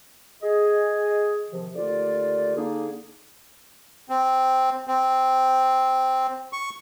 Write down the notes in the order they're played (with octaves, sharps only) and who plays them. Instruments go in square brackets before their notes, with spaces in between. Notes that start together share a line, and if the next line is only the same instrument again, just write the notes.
[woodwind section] G#4 D#5
C3 D#3 F3
D#2 D3 A3 F4 D5
D3 A#3 D#4 G#4
[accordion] C4
C4
C#6